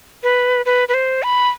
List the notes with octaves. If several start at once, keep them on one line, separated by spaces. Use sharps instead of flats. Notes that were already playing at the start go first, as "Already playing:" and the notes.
B4
B4
B4
C5
B5